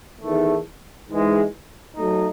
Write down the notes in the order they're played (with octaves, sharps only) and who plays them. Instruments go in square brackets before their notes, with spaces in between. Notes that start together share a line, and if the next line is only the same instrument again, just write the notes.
[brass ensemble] E2 D#3 A3
G#2 E3 G#3
F#3 A3 D#4